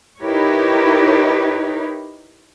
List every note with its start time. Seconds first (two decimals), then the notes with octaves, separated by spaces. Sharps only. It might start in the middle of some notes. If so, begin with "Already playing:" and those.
0.20 D#4 E4 G4 A#4 B4 C#5